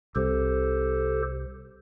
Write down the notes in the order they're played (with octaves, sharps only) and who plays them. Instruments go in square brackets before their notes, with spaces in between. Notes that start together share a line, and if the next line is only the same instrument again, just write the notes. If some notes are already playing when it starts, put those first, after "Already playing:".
[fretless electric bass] C2 C3 [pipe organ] G4 A4 C5